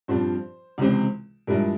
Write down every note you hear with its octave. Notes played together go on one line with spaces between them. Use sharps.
G2 F3 C4 F4 C5
C#2 C3 E3 G#3 C4
G2 F3 G#3 E4 A#4